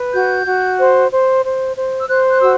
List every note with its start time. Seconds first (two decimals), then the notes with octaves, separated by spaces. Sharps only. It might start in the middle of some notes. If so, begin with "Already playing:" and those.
Already playing: B4
0.14 F#4 G6
0.47 F#4
0.80 C5
1.12 C5
1.44 C5
1.76 C5
2.00 E6
2.09 C5 F#6
2.30 F#6
2.41 F#4 E6